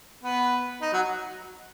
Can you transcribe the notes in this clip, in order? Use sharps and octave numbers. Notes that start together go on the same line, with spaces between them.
B3 B4
D#4
F#3 F#4